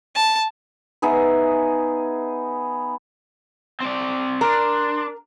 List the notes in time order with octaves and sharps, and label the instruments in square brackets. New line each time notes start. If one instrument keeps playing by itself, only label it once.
[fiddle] A5
[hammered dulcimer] B3 D#4 G#4 E5
[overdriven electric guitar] C4 D5
[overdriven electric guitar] D4 [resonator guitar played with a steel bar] A#4 [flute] C6